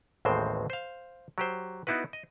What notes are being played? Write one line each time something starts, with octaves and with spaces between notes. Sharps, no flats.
A1 D#2 A2 G#3 C4 C5
C5 F5
F#3 G4 C5
B3 D#4 E4 F#4 B4
D#5